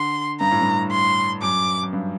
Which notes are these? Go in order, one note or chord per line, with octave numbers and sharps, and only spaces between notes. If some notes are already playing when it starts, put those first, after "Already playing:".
Already playing: D3 C6
G2 A#5
A2
G2
C6
F#2 D6
F#2
G2